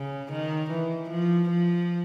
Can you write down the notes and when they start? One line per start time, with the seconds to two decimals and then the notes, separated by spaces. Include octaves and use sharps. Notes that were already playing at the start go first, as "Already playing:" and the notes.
Already playing: C#3
0.32 D#3
0.71 E3
1.10 F3
1.50 F3